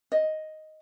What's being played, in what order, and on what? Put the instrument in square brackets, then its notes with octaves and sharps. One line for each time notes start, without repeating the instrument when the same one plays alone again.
[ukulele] D#5